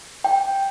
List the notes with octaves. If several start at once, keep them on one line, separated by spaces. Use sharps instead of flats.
G5